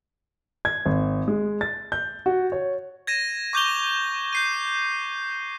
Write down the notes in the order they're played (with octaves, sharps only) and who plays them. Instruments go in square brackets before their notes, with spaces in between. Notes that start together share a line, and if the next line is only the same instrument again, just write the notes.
[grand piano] G#6
G#1
G#3
A6
G6
F#4
C#5
[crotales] G#6 A#6 D#7 E7
C#6 D6 G6 A#6 F7 G7
G6 C7 D#7